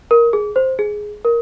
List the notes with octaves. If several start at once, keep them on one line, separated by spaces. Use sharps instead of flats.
A#4
G#4
C5
G#4
A#4